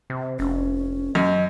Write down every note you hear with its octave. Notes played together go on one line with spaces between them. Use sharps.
C3
F1 C#4
F#2 D#5